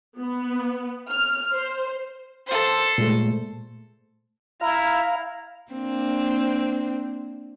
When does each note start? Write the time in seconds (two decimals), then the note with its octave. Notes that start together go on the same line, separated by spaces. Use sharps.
0.19 B3
1.09 F6
1.54 C5
2.47 A4 C5
2.98 A#2 G#3 A3
4.61 E4 F5 A#5
5.72 A#3 C4 D4